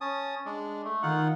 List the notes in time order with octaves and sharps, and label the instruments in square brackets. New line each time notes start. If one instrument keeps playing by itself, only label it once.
[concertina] C#4 A5 D#6
G#3 D4
A3
[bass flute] D#3 [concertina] D#4 F4 F#5